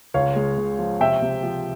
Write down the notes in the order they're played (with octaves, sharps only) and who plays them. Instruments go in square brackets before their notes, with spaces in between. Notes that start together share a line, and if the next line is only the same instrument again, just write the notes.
[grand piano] C#2 [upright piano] C#5 F5
[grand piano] G#3
C#3
F3
[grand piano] C3 [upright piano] E5 G5
[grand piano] C3
F3